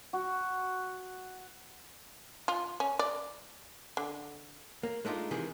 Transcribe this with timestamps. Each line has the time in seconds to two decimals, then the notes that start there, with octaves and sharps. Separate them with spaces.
0.13 F#4
2.48 F4
2.80 C#4
2.99 D5
3.97 D3
4.83 A#3
5.05 G#3 A3 D4 D#4 F4
5.31 C3 D#3 E3 G#4